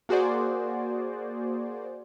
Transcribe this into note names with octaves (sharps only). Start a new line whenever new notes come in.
A#3 F#4 G#4 C5 D5